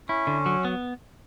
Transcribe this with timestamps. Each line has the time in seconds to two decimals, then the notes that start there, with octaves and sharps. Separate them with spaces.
0.08 C#4 E4
0.27 D3
0.46 F#3
0.65 B3